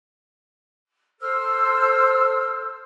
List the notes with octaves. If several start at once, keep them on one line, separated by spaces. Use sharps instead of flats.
A4 C5 E6 F6